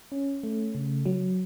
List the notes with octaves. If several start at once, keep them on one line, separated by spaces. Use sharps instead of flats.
C#4
A3
C#3
F#3